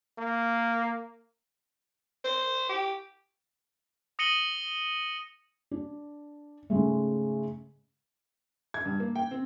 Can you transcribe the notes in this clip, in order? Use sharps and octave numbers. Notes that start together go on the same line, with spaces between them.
A#3
C5
G4
D#6 A#6 C#7 D#7 F#7 G7
D4
G#2 C#3 G#3 A3
G#6
G2
A#3
G5
C4